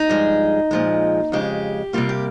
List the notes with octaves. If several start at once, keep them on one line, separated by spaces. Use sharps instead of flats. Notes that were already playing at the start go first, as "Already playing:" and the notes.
Already playing: D#4
G2 F3 G#3
A#2 F3 G#3
F2 C#3 G#3 G4
C3 G3 A#3 F4
G4